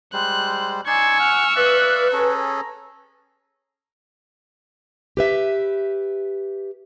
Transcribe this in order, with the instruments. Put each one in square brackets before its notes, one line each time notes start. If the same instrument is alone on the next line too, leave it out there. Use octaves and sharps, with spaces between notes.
[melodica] G3 G#3 C5 [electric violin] F#6
[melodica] D#4 D5 C6 [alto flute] G#5 [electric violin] C#6 E6 [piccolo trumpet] G#6
[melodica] F#5 [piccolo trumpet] F6
[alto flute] B4 [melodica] D5 E5 F5 [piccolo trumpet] F#6
[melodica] C#4 G#4 A4 [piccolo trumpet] A#5
[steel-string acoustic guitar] G4 B4 E5